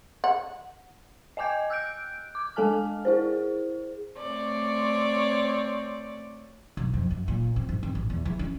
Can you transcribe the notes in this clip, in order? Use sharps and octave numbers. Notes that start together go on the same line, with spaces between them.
F#5
D#5 G5 G#5 D6 G6 G#6
E6 F#6 G6 D7
D6
G#3 A4 G#5 A5 F6
E4 G#4 C5
A3 C4 C#5 D5
B1
F2
F#2
A#2
C4
G#2
C4
A1
E2
E3
C#4